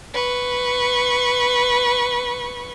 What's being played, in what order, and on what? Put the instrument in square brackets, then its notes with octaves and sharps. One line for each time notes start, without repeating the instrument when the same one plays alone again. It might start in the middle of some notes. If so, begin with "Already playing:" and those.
[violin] B4 C#6